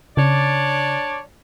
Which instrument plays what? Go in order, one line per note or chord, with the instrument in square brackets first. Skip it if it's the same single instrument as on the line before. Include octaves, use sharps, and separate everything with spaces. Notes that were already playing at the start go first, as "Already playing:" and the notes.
[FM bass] C#3 [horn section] D4 C#5 D5